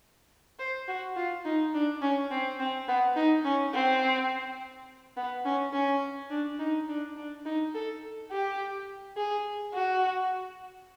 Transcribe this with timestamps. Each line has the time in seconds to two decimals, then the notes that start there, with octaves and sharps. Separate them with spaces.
0.59 C5
0.88 F#4
1.16 F4
1.45 D#4
1.74 D4
2.02 C#4
2.31 C4
2.60 C4
2.88 B3
3.16 D#4
3.45 C#4
3.74 C4
5.17 B3
5.45 C#4
5.73 C#4
6.31 D4
6.59 D#4
6.88 D4
7.17 D4
7.45 D#4
7.74 A4
8.31 G4
9.17 G#4
9.74 F#4